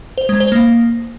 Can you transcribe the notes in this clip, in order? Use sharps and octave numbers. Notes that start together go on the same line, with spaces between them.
C5
G#3
C5
A#3